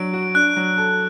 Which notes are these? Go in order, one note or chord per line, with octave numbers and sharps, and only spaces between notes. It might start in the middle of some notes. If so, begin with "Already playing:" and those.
Already playing: F#3 D4 D7
F#4
D4 F#6
F#3
A4